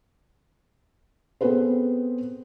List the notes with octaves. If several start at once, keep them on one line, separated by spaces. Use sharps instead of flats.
B3 C4 G#4 A4 B4 C5